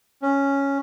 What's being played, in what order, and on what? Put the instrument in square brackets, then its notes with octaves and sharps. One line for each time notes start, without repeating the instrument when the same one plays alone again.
[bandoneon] C#4